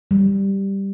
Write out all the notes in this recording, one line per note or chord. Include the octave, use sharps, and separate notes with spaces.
G3